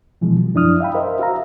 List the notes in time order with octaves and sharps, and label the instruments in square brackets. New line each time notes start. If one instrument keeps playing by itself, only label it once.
[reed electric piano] B2 E3 F3 G#3
F#3
F#2 F3 D4 E4 D#6 F6
E5 F5 G5 B5
A#4 C5 D#5 E5
F#4 E5 F5 A#5